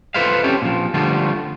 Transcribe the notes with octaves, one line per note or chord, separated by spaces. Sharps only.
F4 A4 B4 C5 E5 F5
C4 C#4 G4 A4
A#2 F3
D3 F3 G3 A3 F4